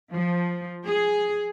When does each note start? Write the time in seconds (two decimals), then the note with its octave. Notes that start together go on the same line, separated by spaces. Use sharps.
0.11 F3
0.86 G#4